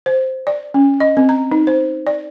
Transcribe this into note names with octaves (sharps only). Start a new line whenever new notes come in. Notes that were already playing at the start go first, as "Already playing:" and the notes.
C5
D5
C#4
D#5
C4
A#5
D#4
C5
D5